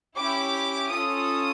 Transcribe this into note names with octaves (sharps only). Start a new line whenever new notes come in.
C#4 E4 G4 D6
C#4 F4 A4 D#6